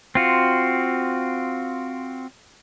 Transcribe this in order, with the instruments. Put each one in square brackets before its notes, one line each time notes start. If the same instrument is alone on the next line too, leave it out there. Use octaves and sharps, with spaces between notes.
[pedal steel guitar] C4 F4 F#4